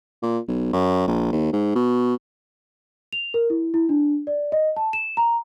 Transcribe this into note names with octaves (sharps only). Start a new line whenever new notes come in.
A#2
B1
F#2
A#1
D#2
G#2
B2
F7
A#4
E4
E4
D4
D5
D#5
A5
E7
A#5